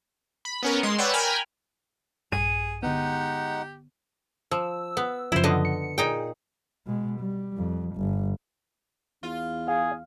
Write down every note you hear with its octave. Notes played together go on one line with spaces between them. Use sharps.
B5
B3 C#4 A#4
G#3 C6
B4 C#5 D5 F#5 G5 E6
A#4 G5 G#5 B5 F6
A#1 G2 G#4 D#7
D3 G#3 B3 D#4 G4 F#5
F3 E6
B3
F#2 C#3 F3 E4 C5
D3 B3 D#5
C#7
A#2 D#4 G#4 G5
B2 G#3
G3
F2
G1
E2 F4
G#4 F5